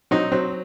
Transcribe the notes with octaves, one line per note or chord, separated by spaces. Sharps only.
F#3 C4 D#4
F#3 C4